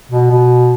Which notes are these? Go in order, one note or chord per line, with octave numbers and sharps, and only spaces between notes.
B2
B2